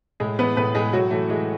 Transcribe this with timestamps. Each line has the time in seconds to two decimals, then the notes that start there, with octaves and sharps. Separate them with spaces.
0.20 A2 G#3 G#4
0.38 E3 B3 B4
0.56 A2 B3 B4
0.75 A2 G#3 G#4
0.93 A2 F#3 F#4
1.11 E3 A3
1.30 E3 G#3